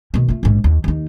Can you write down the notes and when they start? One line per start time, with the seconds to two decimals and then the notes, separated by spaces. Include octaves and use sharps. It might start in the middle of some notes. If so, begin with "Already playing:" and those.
0.14 B2 D#3
0.28 A3 F4
0.43 A#1 G#2
0.64 D#2
0.84 D#2 D#4